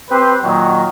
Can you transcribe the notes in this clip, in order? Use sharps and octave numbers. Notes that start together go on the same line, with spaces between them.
C4 G4 B4 C5
A#2 D#3 F#3